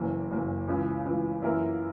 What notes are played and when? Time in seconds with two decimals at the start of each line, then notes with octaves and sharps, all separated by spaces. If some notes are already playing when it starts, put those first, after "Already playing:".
Already playing: F#1 F#2 E3 A#3
0.31 F#1 F#2 E3 A#3
0.68 C#2 C#3 E3
1.05 C#2 C#3 E3
1.42 F#2 E3 A#3 E4 A#4